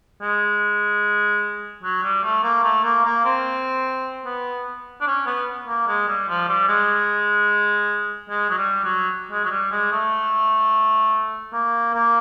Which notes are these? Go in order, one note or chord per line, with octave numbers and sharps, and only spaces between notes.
G#3
F#3
G3
A3
A#3
A3
A#3
A#3
C4
B3
D4
C#4
B3
A#3
G#3
G3
F3
G3
G#3
G#3
F#3
G3
F#3
G#3
F#3
G3
G#3
A3
A#3
A#3